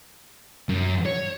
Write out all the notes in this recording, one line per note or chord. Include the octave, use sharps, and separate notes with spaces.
F#2
C#5